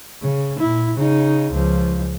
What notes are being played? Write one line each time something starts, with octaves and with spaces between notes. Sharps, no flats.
C#3
A#2 E4
C#3 D#4
C#2 F3